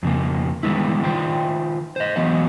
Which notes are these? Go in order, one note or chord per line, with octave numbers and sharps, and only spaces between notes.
F2 C#3 A#3
D#3 E3 G3 G#3 B3 E4
D#3 E3 F4 C5 G5
C5 D#5
E3 F#3 B3 D#5